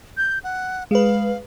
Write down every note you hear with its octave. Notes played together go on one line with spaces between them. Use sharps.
G6
F#5
G#3 B4 F5